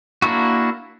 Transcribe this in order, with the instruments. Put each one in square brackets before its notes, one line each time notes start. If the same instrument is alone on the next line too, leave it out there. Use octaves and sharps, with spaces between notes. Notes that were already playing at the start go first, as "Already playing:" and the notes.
[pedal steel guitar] A#3 D4 E4 F#4